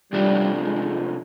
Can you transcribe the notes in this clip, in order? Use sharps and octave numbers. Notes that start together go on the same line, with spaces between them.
C3 F3 G3 A3 D4 F4
G#3